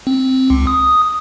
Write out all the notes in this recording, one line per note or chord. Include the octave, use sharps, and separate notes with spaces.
C4
C#2
D#6